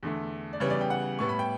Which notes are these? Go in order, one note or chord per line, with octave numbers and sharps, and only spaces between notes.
E2 D3 A3
D5
C#3 E3 G3 B3 C#5
D5
G5
F#5
A2 G3 B3 C#6
B5
G5